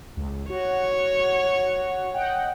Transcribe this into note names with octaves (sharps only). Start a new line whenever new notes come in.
C#2
F#4 C#5
D#5 F#5 G5